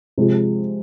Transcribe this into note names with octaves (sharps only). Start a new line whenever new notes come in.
C3 F3 G#3